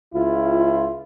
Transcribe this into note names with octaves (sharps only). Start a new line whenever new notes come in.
C#2 E4 F4